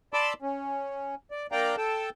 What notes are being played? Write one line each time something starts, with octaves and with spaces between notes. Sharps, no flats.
D5 A5 B5 C6 D6 E6
C#4
D5
A#3 D4 D5 F5 G5 A#5
A4 G5 A5